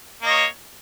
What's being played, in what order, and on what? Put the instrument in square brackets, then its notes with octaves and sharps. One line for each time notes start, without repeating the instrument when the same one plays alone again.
[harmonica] A#3
D#5
C#5